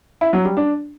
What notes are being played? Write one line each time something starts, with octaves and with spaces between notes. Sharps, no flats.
E4
F#3
G3
D4